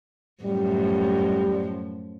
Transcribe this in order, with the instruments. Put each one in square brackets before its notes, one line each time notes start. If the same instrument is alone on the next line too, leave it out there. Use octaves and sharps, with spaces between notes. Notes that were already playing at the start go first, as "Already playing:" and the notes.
[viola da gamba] F#2 A2 F3 [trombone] G3